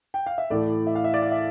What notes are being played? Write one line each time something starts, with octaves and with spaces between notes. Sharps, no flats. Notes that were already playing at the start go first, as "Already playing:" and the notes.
G5
F5
E5
A2 E3 A3 D5
E5
F5
E5
D5
F5
E5